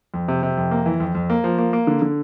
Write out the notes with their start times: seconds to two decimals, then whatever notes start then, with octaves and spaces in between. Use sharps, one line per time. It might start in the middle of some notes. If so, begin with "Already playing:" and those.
0.14 F2
0.28 C3
0.43 C3
0.57 F2
0.71 A#3
0.86 E3
1.00 F2
1.15 F2
1.30 A#3
1.44 F3
1.58 A#3
1.73 A#3
1.87 D3
2.02 D3